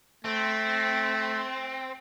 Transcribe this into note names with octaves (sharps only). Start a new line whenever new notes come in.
A3 C4